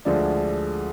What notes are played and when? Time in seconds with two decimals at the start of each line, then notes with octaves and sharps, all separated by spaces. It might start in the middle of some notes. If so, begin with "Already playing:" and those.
0.05 D2 D3 F3 G#3 D4